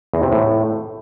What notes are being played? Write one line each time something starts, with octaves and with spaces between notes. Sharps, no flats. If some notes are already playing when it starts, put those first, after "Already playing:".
E2
C3
A2